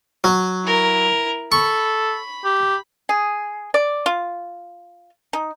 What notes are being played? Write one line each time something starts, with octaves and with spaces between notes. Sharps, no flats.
F#3
E4 A#4
A4 B5 C#6
G4
G#4
D5
F4
D#4